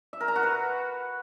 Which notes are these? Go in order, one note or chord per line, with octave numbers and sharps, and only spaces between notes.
E5
A#4
A#5
F#4
B4